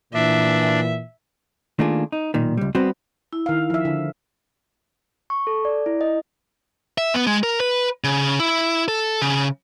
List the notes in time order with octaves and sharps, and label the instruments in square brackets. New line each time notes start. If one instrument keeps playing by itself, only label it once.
[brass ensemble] A#2 E3 [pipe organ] D4 [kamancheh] E5
[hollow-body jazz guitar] D#3 A3 A#3 D4 F4 G#4
D#4
B1 A#2 D#3
C#2 G3
G3 B3 C4 F#4 C5
[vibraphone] E4
[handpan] D#3 F5
F3 E5
D3
[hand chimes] C#6
A4
D5
E4
D#5
[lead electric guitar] E5
B3
G#3
A#4
B4
C#3
E4
A4
C#3